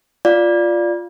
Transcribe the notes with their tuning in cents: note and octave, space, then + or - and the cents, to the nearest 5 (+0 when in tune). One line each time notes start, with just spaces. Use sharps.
F4 +0 D5 +0 F5 +0